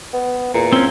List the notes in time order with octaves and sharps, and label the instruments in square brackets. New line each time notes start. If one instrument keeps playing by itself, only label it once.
[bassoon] B3
[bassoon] E2 [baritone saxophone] A#2
[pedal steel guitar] C4 C#4